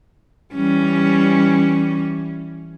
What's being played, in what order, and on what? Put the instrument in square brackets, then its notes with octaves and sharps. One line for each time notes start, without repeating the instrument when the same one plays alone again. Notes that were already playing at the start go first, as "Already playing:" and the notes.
[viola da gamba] E3 G3 C#4